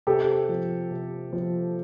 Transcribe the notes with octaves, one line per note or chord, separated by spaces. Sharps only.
C3 G4 A4
F3
C3
F3